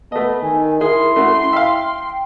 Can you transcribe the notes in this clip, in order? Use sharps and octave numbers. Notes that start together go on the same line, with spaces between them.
A3 B3 D#5 A5
D#3 G#5
E4 G#4 A#4 C6
A3 C#4 F#4
E5 F5 G5